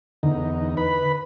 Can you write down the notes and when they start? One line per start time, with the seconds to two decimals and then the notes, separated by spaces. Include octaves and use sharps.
0.23 E2 D3 D#4
0.77 B4 B5